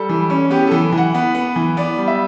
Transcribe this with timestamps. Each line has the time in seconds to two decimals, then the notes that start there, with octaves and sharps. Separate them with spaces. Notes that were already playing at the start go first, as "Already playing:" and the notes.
Already playing: G3 A4
0.09 E3
0.30 C#4
0.50 B3 G4
0.67 E3 A4
0.92 E3
0.98 F#5
1.14 B3
1.35 B3
1.56 E3
1.77 B3 D5
1.98 G3
2.08 E5